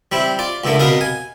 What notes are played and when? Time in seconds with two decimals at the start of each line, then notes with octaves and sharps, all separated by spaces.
0.12 G3 C4 E4
0.39 F4 D5
0.64 C#2 A2 D3 A3 A#3
0.79 C2 B2 B3 A#4 D#5 F5
1.01 G#5